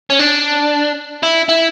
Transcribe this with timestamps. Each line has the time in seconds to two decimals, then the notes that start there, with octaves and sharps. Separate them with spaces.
0.10 C#4
0.19 D4
1.23 E4
1.49 E4